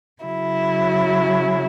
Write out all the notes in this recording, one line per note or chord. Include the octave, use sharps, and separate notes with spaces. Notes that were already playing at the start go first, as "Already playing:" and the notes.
C#3 F#3 E4